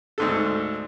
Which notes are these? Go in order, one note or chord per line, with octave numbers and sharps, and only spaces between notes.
D2 G#2 A4